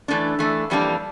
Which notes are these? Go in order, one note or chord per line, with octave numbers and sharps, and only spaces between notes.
E3 A3 D4
E3 A3 D4
F2 E3 G3 A#3 D4